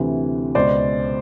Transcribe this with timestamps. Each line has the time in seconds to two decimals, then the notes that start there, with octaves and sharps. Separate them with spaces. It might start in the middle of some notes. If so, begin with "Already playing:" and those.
Already playing: D2 C3 E3
0.55 C#2 B2 C5 D5